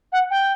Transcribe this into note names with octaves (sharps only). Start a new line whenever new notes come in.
F#5
G5